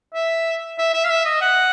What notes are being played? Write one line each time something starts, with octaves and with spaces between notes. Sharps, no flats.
E5
E5
E5
F5
E5
D#5
F#5